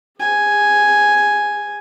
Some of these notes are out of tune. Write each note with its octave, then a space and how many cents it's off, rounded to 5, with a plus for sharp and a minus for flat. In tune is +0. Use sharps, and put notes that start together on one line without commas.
G#4 -40 G#5 +0